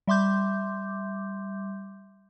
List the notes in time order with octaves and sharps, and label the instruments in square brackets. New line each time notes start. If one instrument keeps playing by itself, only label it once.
[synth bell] G3 E5 C6 D6 G6